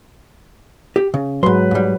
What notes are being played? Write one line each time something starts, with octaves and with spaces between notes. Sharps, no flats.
G4
C#3
G#2 F#3 B4 C6
G#2 G3